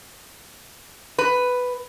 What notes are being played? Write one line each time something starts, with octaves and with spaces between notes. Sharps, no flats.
B4